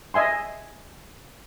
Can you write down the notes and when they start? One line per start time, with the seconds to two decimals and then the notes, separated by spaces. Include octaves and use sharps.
0.14 D#5 E5 G#5 C6